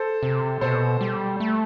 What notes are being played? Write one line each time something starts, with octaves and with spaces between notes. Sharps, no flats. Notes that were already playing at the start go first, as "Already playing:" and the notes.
Already playing: A4 C5
C3
B2 A4 C5
G3
A3